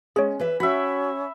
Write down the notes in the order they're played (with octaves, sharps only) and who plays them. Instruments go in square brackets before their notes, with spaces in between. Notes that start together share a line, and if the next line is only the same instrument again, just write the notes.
[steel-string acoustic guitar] G#3 C#4 [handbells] G#4 C#5
[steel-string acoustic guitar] E3 B4 E5
[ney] C#4 [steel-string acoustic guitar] F#4 G5 [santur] E5 B5